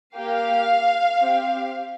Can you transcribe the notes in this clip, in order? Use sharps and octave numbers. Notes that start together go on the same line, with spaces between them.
A#3 G4 F5
C4 G4